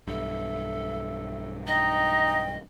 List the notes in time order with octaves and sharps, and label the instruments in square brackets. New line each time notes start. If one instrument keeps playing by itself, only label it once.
[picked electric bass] B1 G2 [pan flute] A4 [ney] E5
[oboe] D#4 [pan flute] D#5 [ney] G5